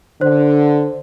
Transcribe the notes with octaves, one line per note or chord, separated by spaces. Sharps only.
D3 C5